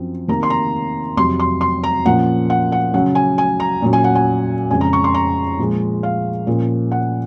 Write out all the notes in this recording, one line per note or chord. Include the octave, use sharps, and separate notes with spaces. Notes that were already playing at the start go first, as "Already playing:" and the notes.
Already playing: F#2 F3 C4
C3 D#3 A#3 A#5
C6
A#5
F2 C3 F#3 C6
C6
C6
A#5
A#2 F3 A#3 C#4 F#5
F#5
F#5
C#3 F#3 C#4 F#5
G#5
G#5
A#5
A#2 F#3 C#4
G#5
F#5
G#5
F2 C#3 G#3 C#4 G#5
A#5
C#6
C6
A#5
A#2 F3 G#3
F5
A#2 F3 A#3 C#4
F#5